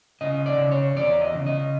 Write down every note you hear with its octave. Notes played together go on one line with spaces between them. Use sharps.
C#3 D#5
D5
C#3
C#5
E2 D5
D#5
C#3
D#5